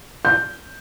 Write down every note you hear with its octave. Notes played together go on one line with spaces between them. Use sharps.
G6